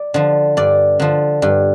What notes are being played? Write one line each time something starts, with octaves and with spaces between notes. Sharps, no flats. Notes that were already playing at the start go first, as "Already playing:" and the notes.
Already playing: D5
D3 F3
G2 D5
D3 F3
G2